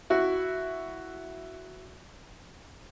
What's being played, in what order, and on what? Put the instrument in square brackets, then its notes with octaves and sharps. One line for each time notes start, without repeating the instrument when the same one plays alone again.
[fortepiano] E4 F#4